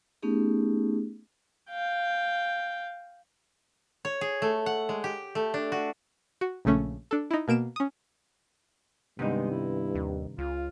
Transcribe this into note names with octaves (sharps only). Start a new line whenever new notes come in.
A3 B3 C#4 D#4 G4 G#4
F5 G5
C#5
G#4
A3
F#5
G#3
G4
A3
D4
F#4
F#4
A#1 C#3 A3 C#4
D4 A4
D#4 E4
B2 A#3 D7 E7
C#4 D#6
G2 C3 D#3 G#3 B3 D#4
E4
D#2
C#2 F4